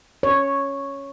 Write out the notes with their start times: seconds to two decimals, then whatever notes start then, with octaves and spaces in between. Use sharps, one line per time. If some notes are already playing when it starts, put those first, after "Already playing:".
0.23 C#5